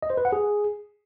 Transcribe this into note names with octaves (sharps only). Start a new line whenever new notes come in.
D#5
C5
B4
F#5
G#4